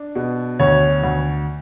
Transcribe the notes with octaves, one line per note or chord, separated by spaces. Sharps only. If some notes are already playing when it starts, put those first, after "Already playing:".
Already playing: D4
B2
D2 C#5
D2